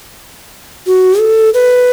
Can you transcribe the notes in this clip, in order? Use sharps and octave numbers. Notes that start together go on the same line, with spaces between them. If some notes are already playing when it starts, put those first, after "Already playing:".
F#4
A4
B4